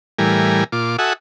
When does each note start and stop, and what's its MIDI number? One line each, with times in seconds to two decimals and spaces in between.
0.19 0.64 45
0.19 0.64 52
0.19 0.64 55
0.19 0.64 70
0.19 0.64 80
0.72 0.97 46
0.72 0.97 65
0.72 0.97 86
0.99 1.13 66
0.99 1.13 69
0.99 1.13 76
0.99 1.13 78
0.99 1.13 80
0.99 1.13 87